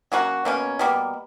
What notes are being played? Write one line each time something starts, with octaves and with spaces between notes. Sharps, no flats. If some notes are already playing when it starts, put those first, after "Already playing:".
F#3 A#3 C#4 F#4
B2 A#3 C#4
B2 G3 A#3